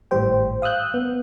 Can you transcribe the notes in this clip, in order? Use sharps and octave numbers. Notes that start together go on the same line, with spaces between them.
G#1 A2 G3 C5 G5
F5 D#6 E6 F#6 G6
B3